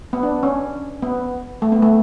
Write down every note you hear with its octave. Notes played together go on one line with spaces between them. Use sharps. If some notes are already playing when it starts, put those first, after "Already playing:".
B3
D4
C#4
B3
A3
B3
A3